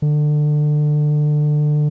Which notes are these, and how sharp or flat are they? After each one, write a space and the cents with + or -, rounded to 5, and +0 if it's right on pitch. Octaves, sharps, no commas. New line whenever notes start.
D3 +25